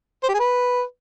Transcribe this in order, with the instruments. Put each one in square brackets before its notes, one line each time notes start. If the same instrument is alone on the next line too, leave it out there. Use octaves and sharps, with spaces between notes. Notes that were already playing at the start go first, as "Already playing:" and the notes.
[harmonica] C5
G4
G#4
B4